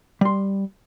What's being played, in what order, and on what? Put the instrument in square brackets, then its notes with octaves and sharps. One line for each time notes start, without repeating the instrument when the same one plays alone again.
[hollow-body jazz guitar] G3 C6